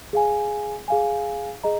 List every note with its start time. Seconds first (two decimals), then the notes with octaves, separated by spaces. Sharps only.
0.13 G#4 F5 G#5
0.88 G#4 F5 G#5
1.64 G#4 D#5 A#5